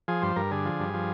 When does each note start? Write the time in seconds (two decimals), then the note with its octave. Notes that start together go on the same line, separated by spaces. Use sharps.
0.08 F3 G#4
0.22 G2 C5
0.36 G2 A#4
0.51 D3 G#4
0.65 F3
0.79 G2
0.94 F3